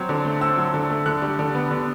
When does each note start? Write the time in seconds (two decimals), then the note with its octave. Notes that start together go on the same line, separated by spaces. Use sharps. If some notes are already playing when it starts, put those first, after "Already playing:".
Already playing: F#3 C4
0.09 D3
0.25 A3
0.41 C4 E6
0.57 F#3
0.74 D3
0.90 A3
1.06 D3 F#6
1.22 G3
1.39 D3
1.55 B3
1.71 D3